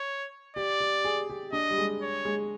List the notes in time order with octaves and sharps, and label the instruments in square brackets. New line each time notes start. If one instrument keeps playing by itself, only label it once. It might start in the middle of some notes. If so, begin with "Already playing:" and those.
Already playing: [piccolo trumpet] C#5
[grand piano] G4 [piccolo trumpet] D5
[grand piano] G4
G#4
G4
[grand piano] D4 [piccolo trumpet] D#5
[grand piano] G3
G#3
[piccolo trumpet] C#5
[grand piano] G#3